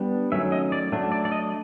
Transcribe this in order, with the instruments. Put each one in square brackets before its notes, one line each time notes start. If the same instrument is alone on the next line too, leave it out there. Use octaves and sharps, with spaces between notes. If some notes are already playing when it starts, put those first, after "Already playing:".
Already playing: [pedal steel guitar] G3 B3 D4
D#3 F#3 A3 C#4 E5
D#5
D5
F#3 A3 D4
D5
D5
D#5